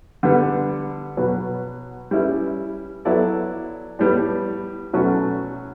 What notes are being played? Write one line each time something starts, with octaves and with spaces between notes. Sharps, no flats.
D3 G3 B3
B2 F#3 B3
G3 C#4 E4 B4
F#3 B3 E4 A4 D5
A2 G3 B3
B2 F#3 A3 C#4